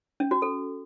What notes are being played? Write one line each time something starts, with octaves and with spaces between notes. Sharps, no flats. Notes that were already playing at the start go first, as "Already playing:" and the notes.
C#4
F#4
A4